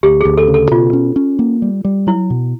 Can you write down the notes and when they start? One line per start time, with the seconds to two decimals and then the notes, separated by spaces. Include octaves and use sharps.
0.03 D2 G4
0.21 D2 G#4
0.37 A4
0.48 C#3
0.54 A4
0.71 B2 F4
0.93 C#4
1.16 C#4
1.39 A#3
1.62 G3
1.84 G3
2.07 F#3 E4
2.30 B2